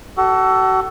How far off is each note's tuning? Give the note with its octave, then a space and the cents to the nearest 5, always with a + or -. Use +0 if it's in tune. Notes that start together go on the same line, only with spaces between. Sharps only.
F#4 +35 A4 +5